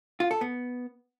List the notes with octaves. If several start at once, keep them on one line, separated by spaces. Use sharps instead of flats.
F4
A4
B3